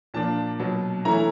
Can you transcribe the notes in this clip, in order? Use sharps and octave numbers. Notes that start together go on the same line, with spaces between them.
A#2 F3 A#3 D4 A5
B2 F#3 B3
E3 A3 C#4 E4 A#5